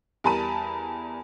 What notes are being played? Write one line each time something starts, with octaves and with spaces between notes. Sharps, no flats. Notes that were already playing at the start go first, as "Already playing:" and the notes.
E2 G3 A#4 A5 B5 D#7